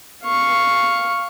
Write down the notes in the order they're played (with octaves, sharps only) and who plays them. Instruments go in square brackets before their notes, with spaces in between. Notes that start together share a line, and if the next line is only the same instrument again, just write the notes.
[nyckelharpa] F5 C#6